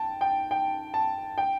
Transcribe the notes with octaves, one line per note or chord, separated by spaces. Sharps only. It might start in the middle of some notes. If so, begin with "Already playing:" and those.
Already playing: G5 A5
G5
G5
A5
G5